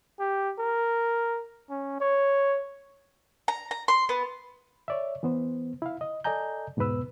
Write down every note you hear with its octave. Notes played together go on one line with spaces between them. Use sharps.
G4
A#4
C#4
C#5
A#5
A#5
C6
B3
C#5 D5 E5
E3 B3 C5
E4 F5
D#5
A4 D5 D#5 G#5 A#5 G6
E2 G#2 B2 B3 B4 E6